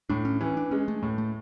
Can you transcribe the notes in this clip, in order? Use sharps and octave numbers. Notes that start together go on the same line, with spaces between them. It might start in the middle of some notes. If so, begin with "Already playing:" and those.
A2 D4
C#4
E3 C#4
D4
G#3 C#4
A3
A2 A3
A3